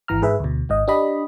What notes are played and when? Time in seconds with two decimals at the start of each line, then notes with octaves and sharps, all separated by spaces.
0.08 G#1 E3 A#5 F6
0.22 G#2 G#4 B4 E5
0.40 D2 B2
0.69 G#1 G#2 D#5
0.88 D4 G4 D#5 B5